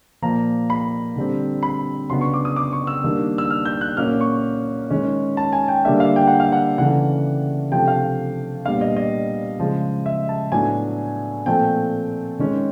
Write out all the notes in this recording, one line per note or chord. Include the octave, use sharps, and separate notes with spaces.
A#2 F3 A#3 A#5
B5
D3 G3 C4
B5
C#3 F#3 B3 D4 C6
C#6
D6
D#6
D6
C#6
E6
D#3 G3 A#3 D4
E6
F6
G6
F#6
A#2 F#3 A#3 C#4 F6
C#6
D#3 G#3 C#4
A5
G#5
G5
D3 G3 A#3 D4 E5
F5
G5
F#5
F5
F#5
C#3 E3 A3 D4 F#5
C3 F3 A3 D4 G5
F5
A#2 G3 B3 D4 F5
D#5
D#5
C#3 F3 G#3
E5
A5
A2 F#3 B3 D4 G#5
A#2 F3 A3 C4 G5
D#3 G#3 C#4